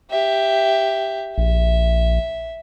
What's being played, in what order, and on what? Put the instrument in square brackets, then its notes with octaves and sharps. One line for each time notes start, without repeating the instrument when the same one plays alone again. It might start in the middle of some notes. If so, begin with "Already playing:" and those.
[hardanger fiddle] G4 E5
[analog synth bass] A#1 [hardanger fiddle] E5